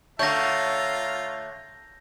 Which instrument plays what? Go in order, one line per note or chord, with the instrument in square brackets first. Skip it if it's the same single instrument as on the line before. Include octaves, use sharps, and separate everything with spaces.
[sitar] D3 C#5 [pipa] A3 [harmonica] F4 F5 A#5 [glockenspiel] G6 A#6